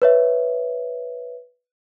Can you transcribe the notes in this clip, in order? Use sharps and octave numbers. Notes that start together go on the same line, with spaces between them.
B4 C#5 E5